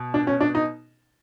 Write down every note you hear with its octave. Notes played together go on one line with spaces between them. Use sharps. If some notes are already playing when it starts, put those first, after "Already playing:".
Already playing: B2
D4
C#4
D4
D#4